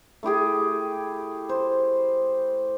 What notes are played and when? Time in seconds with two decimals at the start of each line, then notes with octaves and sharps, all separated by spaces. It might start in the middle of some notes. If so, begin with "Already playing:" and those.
0.23 A3 E4 G4 G#4
1.49 C5